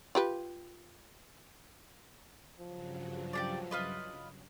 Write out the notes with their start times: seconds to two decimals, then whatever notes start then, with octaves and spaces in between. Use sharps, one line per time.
0.15 F4 G4 B4
2.60 G2 C#3 F3 F#3
3.33 G4 G#4 D5
3.71 F4 B4 D#5